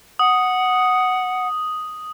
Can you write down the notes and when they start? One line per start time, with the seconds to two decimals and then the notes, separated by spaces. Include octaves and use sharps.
0.19 F#5 D#6